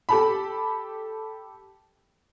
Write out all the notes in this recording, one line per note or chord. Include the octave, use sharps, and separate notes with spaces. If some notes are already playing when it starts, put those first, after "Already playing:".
G4 A4 B5